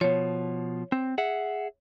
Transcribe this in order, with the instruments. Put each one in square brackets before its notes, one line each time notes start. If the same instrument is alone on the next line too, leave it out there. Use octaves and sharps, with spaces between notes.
[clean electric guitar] B2 F3 [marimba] C#5
[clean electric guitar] C4
G#4 E5 F#5